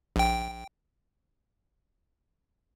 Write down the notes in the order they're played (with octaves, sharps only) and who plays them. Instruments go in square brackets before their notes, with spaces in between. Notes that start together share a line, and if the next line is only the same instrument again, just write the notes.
[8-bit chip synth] A#1 G5